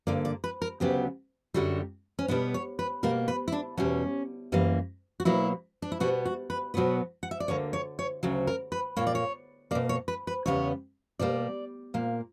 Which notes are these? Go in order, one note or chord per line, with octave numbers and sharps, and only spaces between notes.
G2 D3 A#3 D5
D5
B4
A#4
D2 C#3 F#3 B3 G4
F#2 D3 G3 F#4
C#4
B2 G3 B3 D4
C#5
B4
B2 G3 A#3 A#4
B4
E4
D4
E2 B2 G3 C#4
F#2 E3 G3 A#3
F#4
B2 F#3 A#3 E4
D4
E4
B2 G3 B3 F#4
F#4
B4
B2 F#3 B3 B4
F#5
E5
D5
D2 D3 A#3 C#5
C#5
C#5
D2 C#3 F#3
A#4
B4
A#2 A#3 C#5
D5
C#5
B2 A#3 D5
C#5
B4
B4
E2 C#3 G3 B3 C#5
B2 G3 A#3 D5
A#2 A#3